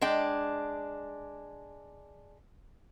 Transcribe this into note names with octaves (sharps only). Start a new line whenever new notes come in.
G#3 D4 G5